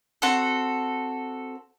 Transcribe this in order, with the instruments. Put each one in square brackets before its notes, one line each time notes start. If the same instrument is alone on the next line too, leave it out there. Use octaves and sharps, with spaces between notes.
[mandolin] C4 F#4 A4